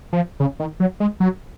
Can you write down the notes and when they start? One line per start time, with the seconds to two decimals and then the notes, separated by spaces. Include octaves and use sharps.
0.13 F3
0.40 C#3
0.60 D#3
0.80 F#3
1.00 G#3
1.20 F#3